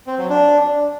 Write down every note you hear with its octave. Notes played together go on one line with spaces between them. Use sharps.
C4
F#3
D4